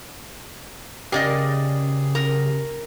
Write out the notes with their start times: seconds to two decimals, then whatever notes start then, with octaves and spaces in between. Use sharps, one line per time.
1.12 C#3 G4 G#4 A#4 D5 D#5
2.15 A#4